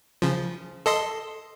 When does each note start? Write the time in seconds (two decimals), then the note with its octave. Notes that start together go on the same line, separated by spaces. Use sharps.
0.22 C#3 F3
0.86 A4 D#5 C6